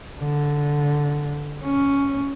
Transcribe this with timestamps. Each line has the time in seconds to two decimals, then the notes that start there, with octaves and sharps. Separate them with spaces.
0.19 D3
1.65 C#4